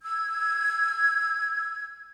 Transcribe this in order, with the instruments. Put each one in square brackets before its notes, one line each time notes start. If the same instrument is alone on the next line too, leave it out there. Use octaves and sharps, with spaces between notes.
[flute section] E6 G#6